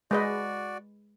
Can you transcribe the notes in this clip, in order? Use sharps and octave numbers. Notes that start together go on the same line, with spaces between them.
G#3 F#4 B4 D5 D#5